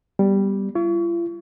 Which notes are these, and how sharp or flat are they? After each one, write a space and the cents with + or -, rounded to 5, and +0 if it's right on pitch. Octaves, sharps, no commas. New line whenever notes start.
G3 +0 B3 -10
F4 -45 C#6 +30